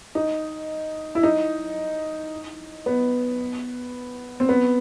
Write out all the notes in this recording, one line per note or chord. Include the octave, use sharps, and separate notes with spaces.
D#4
E4
D#4
B3
C4
B3